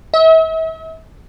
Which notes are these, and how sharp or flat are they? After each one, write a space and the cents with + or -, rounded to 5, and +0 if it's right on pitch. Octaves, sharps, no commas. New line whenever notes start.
E5 -40